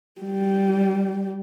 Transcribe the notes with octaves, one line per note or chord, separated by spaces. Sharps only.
G3